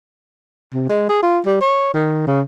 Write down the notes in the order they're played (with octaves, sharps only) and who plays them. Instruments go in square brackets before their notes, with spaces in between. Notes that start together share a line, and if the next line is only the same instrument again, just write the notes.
[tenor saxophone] C3
G#3
G#4
F4
G3
C#5
D#3
C#3